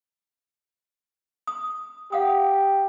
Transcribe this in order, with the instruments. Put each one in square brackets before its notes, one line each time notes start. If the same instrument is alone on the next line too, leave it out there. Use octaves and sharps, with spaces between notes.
[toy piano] D#6
[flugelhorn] G4 [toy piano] F5 F#5 D#6